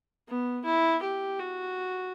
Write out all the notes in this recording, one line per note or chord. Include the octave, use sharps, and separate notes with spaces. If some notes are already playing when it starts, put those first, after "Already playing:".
B3
E4
G4
F#4